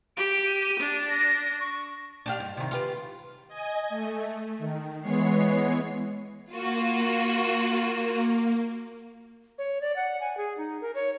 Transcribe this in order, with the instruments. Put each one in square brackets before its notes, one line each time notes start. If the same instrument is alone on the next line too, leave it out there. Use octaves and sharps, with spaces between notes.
[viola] G4 [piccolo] D7
[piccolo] D#7
[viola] D4
[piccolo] A#6
C#6
[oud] D4 G4 F5
G2
C3 D#3
F4 G4 B4
[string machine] D#5 G#5
A3
D#3
E3 G#3 B3 C#5 C7
[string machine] A#3 [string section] F4 F#4
[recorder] C#5
D5
F#5
G#5
G#4
D#4
A#4
C#5